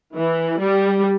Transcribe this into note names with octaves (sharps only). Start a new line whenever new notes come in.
E3
G3